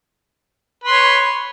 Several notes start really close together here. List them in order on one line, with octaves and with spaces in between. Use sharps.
B4 C6 C#5